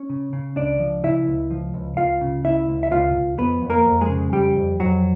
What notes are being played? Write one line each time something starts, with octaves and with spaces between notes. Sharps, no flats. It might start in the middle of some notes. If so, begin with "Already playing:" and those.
Already playing: C#4 C#5
C#3
C#3
C#2 D4 D5
F3
C#3 E4 E5
C#2
F3
C#2
C#2 F4 F5
C#3
C#2 E4 E5
C#2
E5
C#2 F4 F5
C#2
F2 B3 B4
F2
A#3 A#4
F2
G#3 G#4
C#3
F2 G3 G4
F2
F2 F#3 F#4